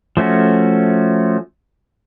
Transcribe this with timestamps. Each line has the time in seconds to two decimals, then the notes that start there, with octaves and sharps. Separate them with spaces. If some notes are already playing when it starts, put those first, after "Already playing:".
0.17 F3 A3 C#4 F#4